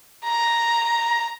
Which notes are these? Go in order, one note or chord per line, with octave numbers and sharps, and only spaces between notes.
A#5